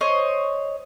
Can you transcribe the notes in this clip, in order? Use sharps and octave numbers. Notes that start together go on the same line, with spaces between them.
C5 C#5 D#5